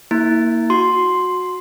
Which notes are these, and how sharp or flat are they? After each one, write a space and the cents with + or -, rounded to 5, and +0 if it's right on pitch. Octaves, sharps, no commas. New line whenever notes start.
A#3 +0 E4 -30
F#4 -20 C6 +0